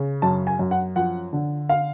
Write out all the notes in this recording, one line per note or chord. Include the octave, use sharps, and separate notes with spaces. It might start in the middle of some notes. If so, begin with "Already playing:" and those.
Already playing: C#3
F#2 A5
G#5
F#2
F#5
F3 F#5
D3
F5